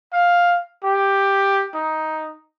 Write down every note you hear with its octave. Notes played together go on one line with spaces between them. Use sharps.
F5
G4
D#4